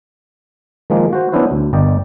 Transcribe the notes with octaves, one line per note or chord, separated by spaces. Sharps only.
D#3 F3 G#3 A#3
F#4 C5
B3 C#4 D4 E4 F#4 C5
D2
G1 A#4 D5 D#5 G5